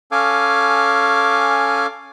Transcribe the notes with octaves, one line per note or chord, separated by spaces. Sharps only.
C#4 A4 F5 G#5 D6